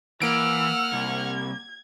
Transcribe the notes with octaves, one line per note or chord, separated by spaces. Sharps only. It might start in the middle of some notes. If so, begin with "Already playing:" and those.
E3 A#3 F#5 E6 F6 D7
C2 G#6